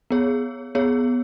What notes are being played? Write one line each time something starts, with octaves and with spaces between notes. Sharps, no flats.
B3 G#4 C#5
B3 G#4 C#5